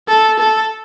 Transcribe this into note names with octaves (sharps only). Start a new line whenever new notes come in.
A4
A4